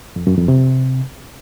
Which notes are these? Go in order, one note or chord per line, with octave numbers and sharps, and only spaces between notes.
F2
F#2
F2
C3